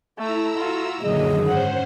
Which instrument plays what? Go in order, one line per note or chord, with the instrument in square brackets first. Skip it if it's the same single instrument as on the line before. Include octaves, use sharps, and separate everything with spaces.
[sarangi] A3 [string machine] E4 A#5 E6 [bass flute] A4
[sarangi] F4 [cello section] F#4
[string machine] F#2 D#3 F#3 [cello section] A#2 D3 [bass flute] G#4 [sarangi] D#5
[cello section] G#2 [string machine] C#4 C5 [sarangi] F#5